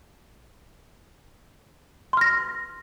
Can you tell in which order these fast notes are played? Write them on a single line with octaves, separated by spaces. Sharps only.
C6 F6 A#6